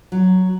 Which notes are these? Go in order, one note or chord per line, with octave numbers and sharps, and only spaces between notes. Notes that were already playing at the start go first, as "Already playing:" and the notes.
F#3